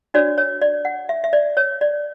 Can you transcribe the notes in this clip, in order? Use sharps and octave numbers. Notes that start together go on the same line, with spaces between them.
D4 F#4 C#5 D5
C#5
D5
F#5
E5
E5
D5
C#5
D5